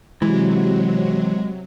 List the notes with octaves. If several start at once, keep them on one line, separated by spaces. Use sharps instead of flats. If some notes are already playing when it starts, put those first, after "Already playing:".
C3 E3 F#3 G#3